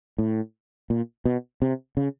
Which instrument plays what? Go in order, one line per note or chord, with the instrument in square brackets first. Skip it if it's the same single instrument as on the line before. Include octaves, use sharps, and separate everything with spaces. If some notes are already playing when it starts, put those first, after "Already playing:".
[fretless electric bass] A2
A#2
B2
C3
C#3